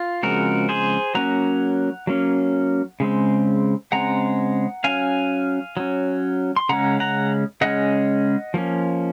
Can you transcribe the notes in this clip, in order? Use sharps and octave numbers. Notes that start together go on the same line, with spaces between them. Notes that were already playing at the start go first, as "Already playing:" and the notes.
Already playing: F4
C#3 F3 G#3 C4 F#4 A#4
G#4 C5
F#3 A#3 C#4 F#5 A#5
F#3 A#3 C#4
C#3 G#3 C4
C#3 G#3 C4 F#5 A#5
F#3 C#4 F5 G#5
F#3 C#4
C6
C#3 G#3 C#4 F#5 A#5
F#5 A#5
C#3 G#3 C#4 D#5 F#5
F3 A#3 C#4